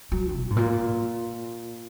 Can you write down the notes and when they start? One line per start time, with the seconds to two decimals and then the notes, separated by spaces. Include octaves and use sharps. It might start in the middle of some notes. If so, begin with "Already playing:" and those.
0.12 F#3
0.34 B2
0.50 G#2
0.57 A#2